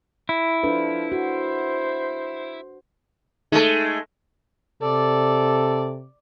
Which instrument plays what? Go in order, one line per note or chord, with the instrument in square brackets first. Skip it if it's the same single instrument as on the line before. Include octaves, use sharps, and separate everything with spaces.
[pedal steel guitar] E4
[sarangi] F3 [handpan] D4 A4 B4
[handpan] F#4 [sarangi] C5
[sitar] G#3 A3 [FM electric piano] D#4 A4
[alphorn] C3 [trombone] A4 [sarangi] D5